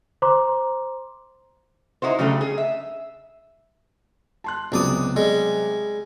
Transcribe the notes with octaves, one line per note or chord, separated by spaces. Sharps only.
C5 A#5 C6 D6
D#4 E4 F#4 C5
C#3 F#3 G3 A3 D4
G#4
E5
A5 C6 F#6
C#2 C3 F#3 B3 D5 D#6
G3 G#3